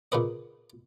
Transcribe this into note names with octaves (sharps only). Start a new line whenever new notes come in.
A#2 C#3 B4 D#5